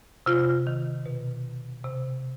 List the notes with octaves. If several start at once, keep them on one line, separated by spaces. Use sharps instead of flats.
C3 F4
D#3
B2
C3